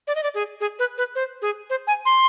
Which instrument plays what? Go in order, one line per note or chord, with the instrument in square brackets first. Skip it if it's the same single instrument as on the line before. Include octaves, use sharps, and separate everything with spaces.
[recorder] D5
D#5
D5
G#4
G#4
B4
B4
C5
G#4
C5
G#5
C6